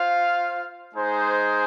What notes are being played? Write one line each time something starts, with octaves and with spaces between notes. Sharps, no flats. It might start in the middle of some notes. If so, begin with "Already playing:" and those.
Already playing: F4 C5 F5
G#3 D#4 G#4 C5